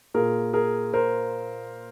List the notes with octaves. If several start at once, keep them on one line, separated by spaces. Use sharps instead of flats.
A#2 G#4 A#4
G#4 A#4
A#4 C5